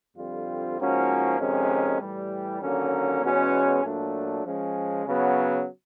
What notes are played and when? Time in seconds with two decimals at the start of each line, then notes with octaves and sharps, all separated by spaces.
0.17 F2 D3 G3 C4 F4
0.78 G#2 F3 A#3 C#4 F#4
1.38 F2 C3 D#3 G#3 C#4
2.00 A2 E3 G3
2.61 D#2 D3 F#3 A#3 C#4
3.22 E2 B2 G#3 C#4 F#4
3.83 A#2 F#3 A3 D4
4.44 F3 G#3 C#4
5.05 C#3 F#3 B3